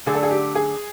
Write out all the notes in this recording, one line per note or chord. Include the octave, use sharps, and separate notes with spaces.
D3 F#3 A3 D4 G#4
A4
G#4
G4
G#4